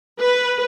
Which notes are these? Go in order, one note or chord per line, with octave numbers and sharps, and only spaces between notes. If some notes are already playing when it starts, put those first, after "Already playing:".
B4